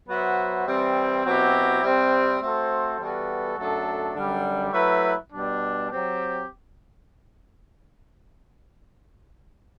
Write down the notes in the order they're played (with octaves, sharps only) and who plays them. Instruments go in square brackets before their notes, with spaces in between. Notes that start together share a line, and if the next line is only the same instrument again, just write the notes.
[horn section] F#3 B3 F#4 C5 E5
E3 G3 C4
B2 F#3 C4 E4 G4
C3 G3 C4
A3 C4 F#4 A4 C5
E3 G3 B3 F#4 A4
F#2 F#3 A3 D4 A4
F#2 D3 G3
F#3 A3 E4 B4
B2 G3 D4
F#3 C4 G4